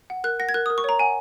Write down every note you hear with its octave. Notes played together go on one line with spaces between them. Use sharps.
F#5
A#4 F#6
F#5 A#6
G#6
A#4 F#6
A#4 D#6
C#6
C#5 A#5
F#5 G#5